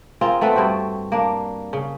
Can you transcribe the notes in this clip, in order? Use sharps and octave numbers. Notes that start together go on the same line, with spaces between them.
C4 F4 G#4 A#4
A3 B3 C4 B4
G2 C4 F#4 G5
A#3 D4
C#3